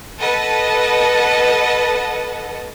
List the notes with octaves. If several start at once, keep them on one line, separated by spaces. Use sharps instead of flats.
A4 B4 D#5 F#5 A5